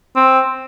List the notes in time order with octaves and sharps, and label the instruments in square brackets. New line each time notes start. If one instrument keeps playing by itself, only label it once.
[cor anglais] C4